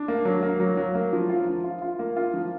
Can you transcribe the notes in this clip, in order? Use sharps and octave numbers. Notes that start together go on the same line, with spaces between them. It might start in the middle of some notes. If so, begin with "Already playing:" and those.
Already playing: D4
A#3
F#3
A#3
F#3
F#3
A#3
F3
F4
F3
F4
F4
A#3
F4
F3